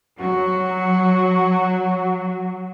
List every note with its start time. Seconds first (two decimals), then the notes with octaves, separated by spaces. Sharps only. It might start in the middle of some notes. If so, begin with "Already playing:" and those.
0.21 F#3 F#4